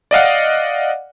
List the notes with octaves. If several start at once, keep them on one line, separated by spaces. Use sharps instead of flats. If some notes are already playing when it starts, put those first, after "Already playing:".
D5 D#5 F5 F#5